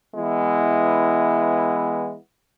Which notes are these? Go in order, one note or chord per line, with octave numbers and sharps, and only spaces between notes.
E3 G#3 B3 E4